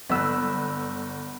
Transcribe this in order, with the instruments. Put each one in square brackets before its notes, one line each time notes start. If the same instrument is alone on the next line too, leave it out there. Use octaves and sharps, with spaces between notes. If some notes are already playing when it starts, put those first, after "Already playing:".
[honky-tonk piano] G1 E6 F#6 [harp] B3